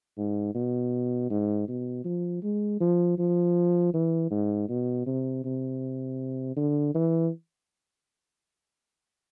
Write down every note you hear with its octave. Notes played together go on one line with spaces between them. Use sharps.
G#2
B2
G#2
B2
F3
G#3
F3
F3
E3
G#2
B2
C3
C3
D3
E3